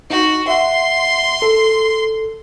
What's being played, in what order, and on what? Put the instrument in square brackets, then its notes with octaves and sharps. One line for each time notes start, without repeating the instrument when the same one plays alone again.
[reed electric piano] D#4 [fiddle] F#4
[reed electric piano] E5 F#5 [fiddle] C6
[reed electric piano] A4